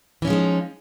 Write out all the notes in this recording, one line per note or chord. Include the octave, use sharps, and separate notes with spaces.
E3 F3 G#3 C#4 D#4